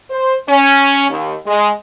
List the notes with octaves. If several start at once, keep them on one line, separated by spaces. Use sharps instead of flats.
C5
C#4
D#2
G#3